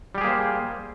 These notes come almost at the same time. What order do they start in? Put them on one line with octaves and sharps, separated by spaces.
G3 G4 G#4 A#3 C5